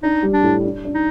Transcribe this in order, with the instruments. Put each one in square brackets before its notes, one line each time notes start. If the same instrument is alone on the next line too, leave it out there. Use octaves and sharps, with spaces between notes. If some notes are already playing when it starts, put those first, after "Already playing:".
[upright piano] D4 [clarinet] D#4
[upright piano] G3
[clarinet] D4
[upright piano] A2
D4
D4
[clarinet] D#4